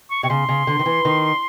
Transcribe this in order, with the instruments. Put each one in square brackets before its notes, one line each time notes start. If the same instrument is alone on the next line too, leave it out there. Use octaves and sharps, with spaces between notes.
[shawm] C#6
[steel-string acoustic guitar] C3 [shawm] C#6
[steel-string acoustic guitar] C#3 [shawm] C6
[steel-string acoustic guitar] C#3
D3
D#3
E3
D#3